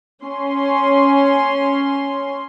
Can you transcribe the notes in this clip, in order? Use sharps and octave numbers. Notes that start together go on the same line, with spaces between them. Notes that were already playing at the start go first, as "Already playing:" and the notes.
C#4 C6